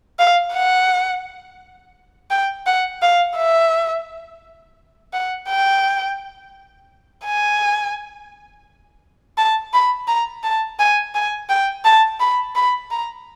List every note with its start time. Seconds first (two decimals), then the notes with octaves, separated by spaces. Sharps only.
0.19 F5
0.54 F#5
2.31 G5
2.67 F#5
3.02 F5
3.37 E5
5.14 F#5
5.49 G5
7.25 G#5
9.38 A5
9.73 B5
10.08 A#5
10.44 A5
10.79 G#5
11.15 G#5
11.50 G5
11.85 A5
12.20 B5
12.56 B5
12.91 A#5